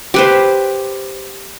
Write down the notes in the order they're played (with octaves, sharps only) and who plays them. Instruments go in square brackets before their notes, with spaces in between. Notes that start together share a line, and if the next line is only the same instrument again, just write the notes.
[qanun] G4 B4 C5